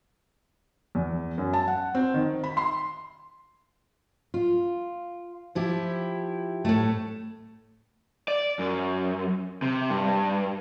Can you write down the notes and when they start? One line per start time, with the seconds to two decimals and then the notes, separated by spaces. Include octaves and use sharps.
0.95 E2
1.38 F#2
1.53 A5
1.68 F#5
1.95 C4
2.14 D#3
2.44 B5
2.57 C6
4.34 F4
5.55 F3 E4 G4
6.65 A2 A3
8.28 D5
8.59 F#2
9.62 C3
9.90 G2